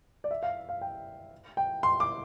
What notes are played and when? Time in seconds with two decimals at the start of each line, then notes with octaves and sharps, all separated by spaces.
0.24 D5
0.31 E5
0.43 F5
0.69 F5
0.81 G5
1.57 G5
1.83 C6
2.00 D6